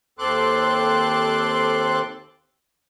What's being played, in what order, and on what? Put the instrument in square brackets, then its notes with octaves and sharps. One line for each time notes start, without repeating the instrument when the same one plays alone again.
[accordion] D#2 C4 A4 C6 D6 F#6